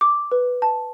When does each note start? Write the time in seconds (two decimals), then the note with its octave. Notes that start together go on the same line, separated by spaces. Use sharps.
0.01 D6
0.32 B4
0.62 A5